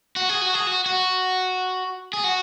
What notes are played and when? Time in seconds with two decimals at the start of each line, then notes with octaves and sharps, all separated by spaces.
0.16 F#4
0.29 G#4
0.41 F#4
0.54 G#4
0.67 F#4
0.86 F#4
2.13 G#4
2.24 F#4